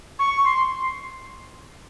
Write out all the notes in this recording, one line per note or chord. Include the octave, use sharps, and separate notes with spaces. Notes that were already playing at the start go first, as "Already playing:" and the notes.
C#6
C6